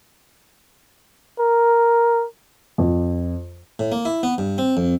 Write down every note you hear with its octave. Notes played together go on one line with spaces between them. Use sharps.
A#4
F2
A2
A#3
E4
B3
G2
C4
F2